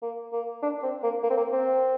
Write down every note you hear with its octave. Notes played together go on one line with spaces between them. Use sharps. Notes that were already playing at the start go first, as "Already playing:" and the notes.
A#3
A#3
D4
C4
A#3
A#3
C4
A#3
C4